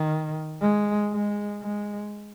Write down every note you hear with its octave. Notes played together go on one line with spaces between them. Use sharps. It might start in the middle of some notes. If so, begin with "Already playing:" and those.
Already playing: D#3
G#3
G#3
G#3